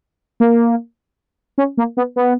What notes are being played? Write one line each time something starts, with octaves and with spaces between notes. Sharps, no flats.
A#3
C#4
A#3
B3
B3